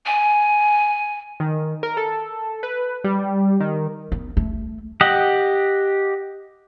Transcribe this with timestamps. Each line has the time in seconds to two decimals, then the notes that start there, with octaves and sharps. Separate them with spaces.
0.06 G#5
1.40 D#3
1.83 A#4
1.97 A4
2.63 B4
3.04 G3
3.60 D#3
4.12 B3
4.37 A3
5.01 G4 D#5 F#5